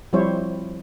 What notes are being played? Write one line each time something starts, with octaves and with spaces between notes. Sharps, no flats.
F3 G3 C4 E4 C5 C#5